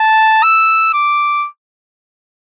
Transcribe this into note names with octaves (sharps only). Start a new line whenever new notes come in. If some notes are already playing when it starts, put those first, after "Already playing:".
Already playing: A5
E6
D6